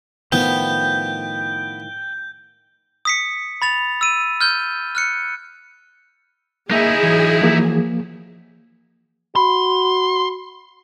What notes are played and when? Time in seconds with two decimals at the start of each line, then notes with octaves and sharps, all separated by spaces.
0.32 A2 D#3 F3 B3 G5 G6
3.05 D#6 B6 C#7
3.62 B5 A6 F7
4.01 E6 D#7
4.41 F6 G6 G7
4.95 F6 F#6 C#7
6.71 A#3 D#4 E4 G#4 E5
7.03 E3 F#3
7.42 F3 A#3
9.36 F#4 B5 C6